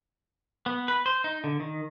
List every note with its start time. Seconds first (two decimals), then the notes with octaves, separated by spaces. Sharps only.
0.66 B3
0.88 B4
1.06 C5
1.24 D#4
1.44 D3
1.60 D#3